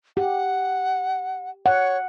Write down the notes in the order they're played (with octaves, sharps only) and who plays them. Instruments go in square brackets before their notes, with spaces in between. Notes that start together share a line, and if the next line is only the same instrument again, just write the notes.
[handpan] G4 [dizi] F#5
[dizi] C#5 [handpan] F#5